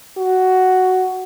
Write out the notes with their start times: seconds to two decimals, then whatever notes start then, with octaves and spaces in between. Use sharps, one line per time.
0.18 F#4